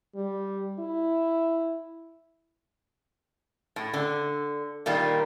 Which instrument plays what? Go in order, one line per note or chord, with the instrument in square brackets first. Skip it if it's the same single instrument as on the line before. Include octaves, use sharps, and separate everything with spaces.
[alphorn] G3
E4
[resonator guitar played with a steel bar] A2
D3
A#2 D#3 G3 A#3